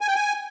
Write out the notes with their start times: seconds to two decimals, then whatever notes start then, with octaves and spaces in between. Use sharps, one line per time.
0.01 G#5
0.08 G5
0.15 G#5